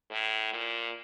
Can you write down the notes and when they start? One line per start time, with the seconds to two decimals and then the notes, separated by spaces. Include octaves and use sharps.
0.11 A2
0.53 A#2